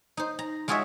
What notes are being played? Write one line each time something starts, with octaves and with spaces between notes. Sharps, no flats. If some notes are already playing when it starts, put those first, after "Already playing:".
D#4 C5
A#5
G#3 F4 F#4 G#4 C#5 E5